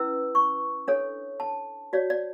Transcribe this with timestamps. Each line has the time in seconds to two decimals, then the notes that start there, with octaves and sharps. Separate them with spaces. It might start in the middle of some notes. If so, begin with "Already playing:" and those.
Already playing: C#4 E4 B4 E6
0.35 C#6
0.88 D4 A4 C#5
1.40 A5
1.93 F#4 C#5 D5
2.10 D5